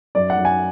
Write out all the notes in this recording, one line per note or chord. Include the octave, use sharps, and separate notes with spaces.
F#2 D5
F#5
F#2
G#5